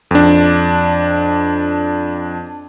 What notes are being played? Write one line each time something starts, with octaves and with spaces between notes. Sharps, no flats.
F2 D4